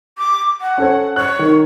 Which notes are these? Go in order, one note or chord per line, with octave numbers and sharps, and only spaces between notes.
D6
F#5
C#4 A4 C#5
C#5 F#6
D#3